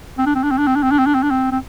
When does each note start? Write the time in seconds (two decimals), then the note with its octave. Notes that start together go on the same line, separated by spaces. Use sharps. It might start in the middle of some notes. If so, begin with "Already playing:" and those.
0.18 C4
0.26 D4
0.35 C4
0.43 D4
0.51 C4
0.58 D4
0.67 C4
0.75 D4
0.83 C4
0.91 D4
0.99 C4
1.06 D4
1.15 C4
1.23 D4
1.31 C4
1.52 C4